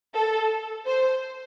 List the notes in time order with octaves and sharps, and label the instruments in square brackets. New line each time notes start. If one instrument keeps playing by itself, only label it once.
[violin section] A4
C5